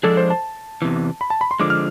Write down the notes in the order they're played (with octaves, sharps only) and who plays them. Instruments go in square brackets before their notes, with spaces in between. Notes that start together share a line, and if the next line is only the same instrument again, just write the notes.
[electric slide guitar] F3 G#3 D4 G#4 [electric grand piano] A4
[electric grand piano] C5
A5
[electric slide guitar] E2 C3 E3
[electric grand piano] B5
A5
B5
C6
[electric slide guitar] D3 F3 G#3 [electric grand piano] D6
[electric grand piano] F6